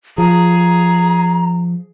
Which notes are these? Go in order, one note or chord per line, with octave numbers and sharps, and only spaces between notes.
F3 G#4 A#5